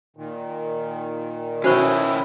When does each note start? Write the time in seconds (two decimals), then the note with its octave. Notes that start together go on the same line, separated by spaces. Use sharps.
0.16 A#2 D#3
1.64 B2 D#3 C#4 E4 F#4 C5 C#6